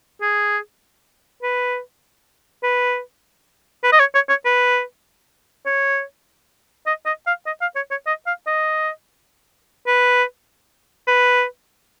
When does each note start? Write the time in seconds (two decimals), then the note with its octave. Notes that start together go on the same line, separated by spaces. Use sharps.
0.22 G#4
1.43 B4
2.63 B4
3.84 B4
3.93 D#5
4.00 C#5
4.15 C#5
4.29 C#5
4.45 B4
5.66 C#5
6.86 D#5
7.06 D#5
7.27 F5
7.46 D#5
7.61 F5
7.76 C#5
7.91 C#5
8.07 D#5
8.27 F5
8.47 D#5
9.87 B4
11.08 B4